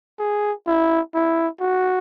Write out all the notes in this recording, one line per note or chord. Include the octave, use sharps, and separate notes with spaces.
G#4
E4
E4
F#4